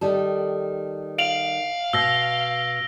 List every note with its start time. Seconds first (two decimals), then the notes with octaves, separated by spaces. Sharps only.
0.01 D#3 G3 A4
1.18 F5 D7 F7 F#7
1.93 B2 E6 A#6